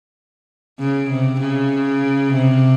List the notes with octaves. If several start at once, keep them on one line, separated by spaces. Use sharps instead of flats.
C#3
C3
C#3
C3